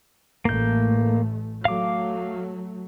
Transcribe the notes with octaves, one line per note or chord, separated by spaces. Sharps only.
A1 A3 A#3 G6
F#3 A3 F5 D6